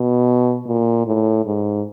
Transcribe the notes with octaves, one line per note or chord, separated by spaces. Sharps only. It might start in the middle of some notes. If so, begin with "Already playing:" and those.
Already playing: B2
A#2
A2
G#2